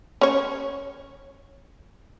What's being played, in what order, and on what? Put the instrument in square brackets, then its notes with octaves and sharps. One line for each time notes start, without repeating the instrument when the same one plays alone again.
[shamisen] C#4 C#5